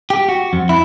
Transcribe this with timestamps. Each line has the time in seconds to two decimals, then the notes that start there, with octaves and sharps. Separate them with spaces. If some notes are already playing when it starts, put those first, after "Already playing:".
0.10 G4
0.29 F#4
0.53 F2
0.69 E4